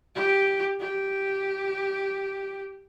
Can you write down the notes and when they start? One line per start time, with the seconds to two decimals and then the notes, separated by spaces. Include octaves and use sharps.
0.15 G4
0.80 G4